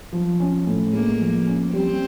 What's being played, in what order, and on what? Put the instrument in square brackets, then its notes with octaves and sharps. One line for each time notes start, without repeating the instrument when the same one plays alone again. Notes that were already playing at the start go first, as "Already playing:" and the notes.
[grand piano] F3
C#4
A2
[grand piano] G#3 [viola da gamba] A#3
[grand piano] F3
C#4
[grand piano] G3 [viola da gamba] C4